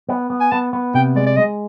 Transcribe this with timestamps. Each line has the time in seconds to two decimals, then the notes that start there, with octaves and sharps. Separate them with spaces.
0.09 B3
0.30 B3
0.40 G#5
0.52 B3 A5
0.73 B3
0.94 C3 G5
1.16 G#3 D5
1.27 D5
1.37 G#3 D#5